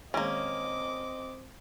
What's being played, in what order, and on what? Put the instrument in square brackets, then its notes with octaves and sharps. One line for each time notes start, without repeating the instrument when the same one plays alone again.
[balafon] D#3 G#3 G#4 [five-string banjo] A#3 C#4 [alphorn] C4 [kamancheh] D#5 D6